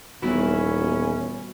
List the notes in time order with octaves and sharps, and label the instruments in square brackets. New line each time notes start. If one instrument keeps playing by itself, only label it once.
[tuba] D#1 [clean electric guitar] D#3 E3 E4 [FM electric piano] G3 B3 F#4 [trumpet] C#4